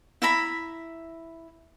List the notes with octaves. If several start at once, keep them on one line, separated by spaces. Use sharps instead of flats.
E4 E5 A#5 B5